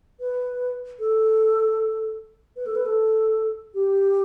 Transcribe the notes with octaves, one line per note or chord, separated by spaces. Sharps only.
B4
A4
B4
A4
B4
A4
G4